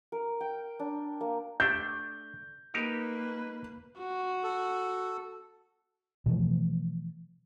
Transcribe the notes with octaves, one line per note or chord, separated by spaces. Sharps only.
A#4
G5
D4
A#3
A3 D4 G6
A#3 D#4 G4 A#4 B4
F#4
A4
B2 E3 F3 A3